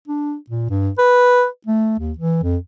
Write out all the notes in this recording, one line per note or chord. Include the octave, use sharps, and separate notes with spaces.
D4
A#2
G2
B4
A3
D#2
E3
F2